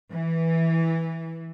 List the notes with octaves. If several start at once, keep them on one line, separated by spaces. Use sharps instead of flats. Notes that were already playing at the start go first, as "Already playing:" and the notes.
E3